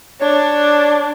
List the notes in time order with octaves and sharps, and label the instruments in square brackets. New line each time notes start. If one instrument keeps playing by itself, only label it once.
[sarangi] D4 [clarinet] C#5